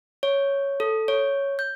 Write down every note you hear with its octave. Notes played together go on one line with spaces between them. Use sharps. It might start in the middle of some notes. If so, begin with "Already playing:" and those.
C#5
A4
C#5
G6